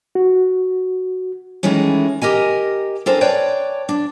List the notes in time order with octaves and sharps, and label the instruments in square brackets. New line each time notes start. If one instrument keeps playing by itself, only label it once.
[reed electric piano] F#4
[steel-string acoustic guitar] D#3 E3 G#3 A3 C#4
G4 A#4 D#5 G#5
C4 D4 A4 A#4 C5 G#5
B4 C#5 D5 G5 A5
D4